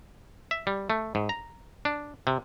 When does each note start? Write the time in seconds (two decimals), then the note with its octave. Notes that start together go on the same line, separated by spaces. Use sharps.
0.51 E5
0.67 G3
0.90 A3
1.15 G#2
1.29 A#5
1.85 D4
2.27 C3